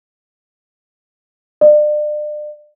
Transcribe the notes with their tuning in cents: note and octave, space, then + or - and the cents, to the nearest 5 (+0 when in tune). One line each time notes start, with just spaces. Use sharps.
D5 +35